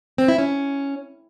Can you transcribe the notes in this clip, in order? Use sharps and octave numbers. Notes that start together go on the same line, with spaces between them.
C4
E4
C#4